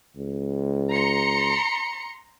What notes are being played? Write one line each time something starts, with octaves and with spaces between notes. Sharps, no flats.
C#2
A#5 C6 C#7